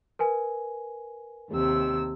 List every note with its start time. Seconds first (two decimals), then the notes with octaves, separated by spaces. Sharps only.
0.19 A#4 B4 G#5
1.50 D#2 C3 E6